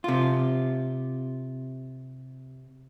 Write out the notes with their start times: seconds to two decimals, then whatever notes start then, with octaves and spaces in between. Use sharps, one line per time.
0.04 C3 F4